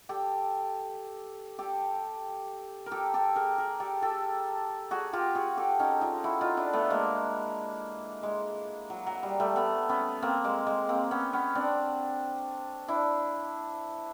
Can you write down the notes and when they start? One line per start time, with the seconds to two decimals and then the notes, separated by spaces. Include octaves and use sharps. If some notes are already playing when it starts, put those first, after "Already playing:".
0.09 G4 A4
1.59 G4 A4
2.86 A#4
2.91 G4 A4
3.14 G4 A4
3.36 G#4 A#4
3.58 G#4 A#4
3.80 G4 A4
4.02 G4 A4
4.91 F#4 G#4
5.13 F4 G4
5.35 F#4 G#4
5.57 G4 A4
5.79 C#4 D#4
6.01 D#4 F4
6.24 E4 F#4
6.41 D#4 F4
6.57 D4 E4
6.73 A3 B3
6.90 G#3 A#3
8.23 G#3
8.90 F#3
9.06 F#3
9.23 G3
9.40 G3 A3
9.56 A3 B3
9.89 B3 C#4
10.22 A#3 C4
10.44 G#3 A#3
10.67 G#3 A#3
10.89 A#3 C4
11.11 B3 C#4
11.33 B3 C#4
11.55 C4 D4
12.88 D4 E4